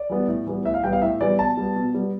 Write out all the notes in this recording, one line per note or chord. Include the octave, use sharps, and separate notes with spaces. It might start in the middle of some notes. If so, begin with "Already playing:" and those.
Already playing: D5
E3 G3 B3
A2
E3 G3 B3
A2 E5
F5
E3 G3 B3 G5
F5
A2 E5
E3 G3 B3 D5
B2 A5
G3 B3
B2
G3 B3